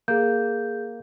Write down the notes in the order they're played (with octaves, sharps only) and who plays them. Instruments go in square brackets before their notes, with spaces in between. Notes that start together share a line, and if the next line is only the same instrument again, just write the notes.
[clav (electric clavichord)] A#3 [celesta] G#4 G6